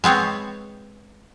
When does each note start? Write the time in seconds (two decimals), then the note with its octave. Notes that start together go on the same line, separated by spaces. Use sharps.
0.04 G#3 B3 C4 C#5